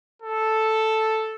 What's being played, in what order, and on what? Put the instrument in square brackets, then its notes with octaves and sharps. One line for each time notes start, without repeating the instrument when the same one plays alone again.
[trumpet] A4